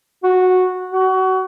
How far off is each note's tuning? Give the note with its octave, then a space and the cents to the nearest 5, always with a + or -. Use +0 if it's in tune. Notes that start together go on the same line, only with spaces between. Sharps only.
F#4 -10
F#4 +25